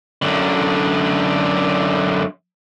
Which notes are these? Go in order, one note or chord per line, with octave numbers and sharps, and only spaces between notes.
F#2 D3